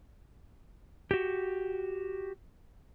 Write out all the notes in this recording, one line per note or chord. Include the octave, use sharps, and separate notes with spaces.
F#4 G4